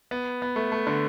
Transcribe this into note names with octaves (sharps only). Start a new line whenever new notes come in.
B3
B3
A3
A3
D3